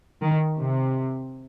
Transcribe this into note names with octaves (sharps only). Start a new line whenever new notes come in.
D#3
C3